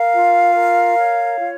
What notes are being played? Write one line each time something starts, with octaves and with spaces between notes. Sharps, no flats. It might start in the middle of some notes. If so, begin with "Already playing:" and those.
Already playing: A#4 F5
F4
A#4
C#5
F4